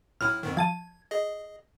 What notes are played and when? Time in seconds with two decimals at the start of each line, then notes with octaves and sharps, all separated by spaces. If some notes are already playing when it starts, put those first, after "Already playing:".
0.21 B1 A2 E4 F6
0.43 F2 G#2 D#3
0.57 F3 A5 G#6 D#7
1.11 G#4 D#5